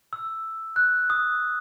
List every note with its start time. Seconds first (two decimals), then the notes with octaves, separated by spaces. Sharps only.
0.13 E6
0.76 F#6
1.10 D#6